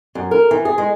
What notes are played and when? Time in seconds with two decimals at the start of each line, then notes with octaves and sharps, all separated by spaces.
0.15 F#2
0.31 A#4
0.51 E3
0.65 G#4
0.78 G#3